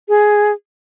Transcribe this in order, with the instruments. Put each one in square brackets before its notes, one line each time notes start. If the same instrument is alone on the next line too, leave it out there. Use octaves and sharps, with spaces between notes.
[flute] G#4